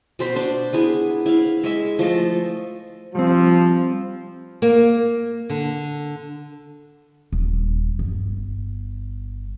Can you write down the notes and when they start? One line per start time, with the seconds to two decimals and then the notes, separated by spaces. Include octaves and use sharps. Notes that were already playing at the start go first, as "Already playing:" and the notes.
0.19 B2 C5 B5
0.36 D4 C5
0.73 B3 E4 G#4
1.26 E4 F5
1.64 G#3 E5
1.99 F3 A3 D#5
3.15 F3 G3 C4
4.62 A#3
5.50 D3
7.33 D#1
7.99 G1